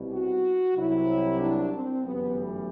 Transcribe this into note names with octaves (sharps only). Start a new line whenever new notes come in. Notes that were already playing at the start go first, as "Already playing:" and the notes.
Already playing: C2 B2 G3
F#4
C2 C3 F#3 E4
D4
C4
G1 F#2 E3 G3 B3
A3